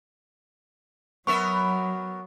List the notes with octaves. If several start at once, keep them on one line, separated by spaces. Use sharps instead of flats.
F#3 B3 A#4 E5 C#6